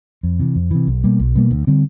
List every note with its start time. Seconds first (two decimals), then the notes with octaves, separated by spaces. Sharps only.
0.23 F2
0.39 C3 E3
0.56 F2
0.71 C3 E3
0.87 B1
1.04 B2 G3 A#3
1.19 B1
1.35 B2 G3 A#3
1.51 D2
1.67 D3 G3 C4